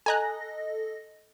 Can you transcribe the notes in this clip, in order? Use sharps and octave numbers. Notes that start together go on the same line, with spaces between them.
A4 D#5 G#5 A#5 F#6 A#6